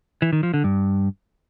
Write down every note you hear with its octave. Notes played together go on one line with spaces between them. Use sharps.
E3
D#3
F3
D3
G2